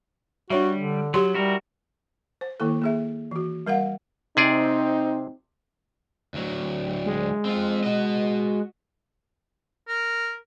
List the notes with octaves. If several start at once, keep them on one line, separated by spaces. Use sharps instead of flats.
G3 D4 F#4 C#5 E5
D3
F#3 G4 C6
G3 E4 F#4 A#4
C5
D#3 A#3 E4 A4
A#3 G#4 E5
E3 F#4
G3 A#4 F5 F#5
C3 C4 D#4 G#4 D5
D2 F#3
G#3
C4 F4
F#4 D#5
A#4